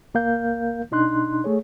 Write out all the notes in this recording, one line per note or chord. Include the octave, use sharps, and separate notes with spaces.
C#2 A#3 A#4 F5 G6
B2 D4 D#4 C6 F#6
A3 G#4 C#5